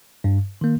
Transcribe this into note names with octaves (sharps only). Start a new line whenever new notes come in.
G2
D#3 A#3